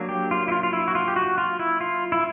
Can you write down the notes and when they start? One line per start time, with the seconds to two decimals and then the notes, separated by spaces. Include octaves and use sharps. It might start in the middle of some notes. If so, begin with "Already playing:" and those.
Already playing: F#3 A#3 D4
0.09 G4
0.31 F4
0.48 E4
0.52 F4
0.63 F4
0.73 E4
0.88 F#4
0.95 F4
1.08 G4
1.16 F#4
1.38 F4
1.59 E4
1.81 F4
2.12 E4